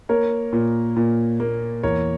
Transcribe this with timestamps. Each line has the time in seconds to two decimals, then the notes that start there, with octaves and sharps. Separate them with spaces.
0.09 A#3 A#4 C#5
0.53 A#2
0.96 A#2
1.40 A#3
1.83 E2 A#4 C#5